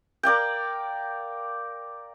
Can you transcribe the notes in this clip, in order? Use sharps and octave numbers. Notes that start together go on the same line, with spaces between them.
A#4 D5 F5 G5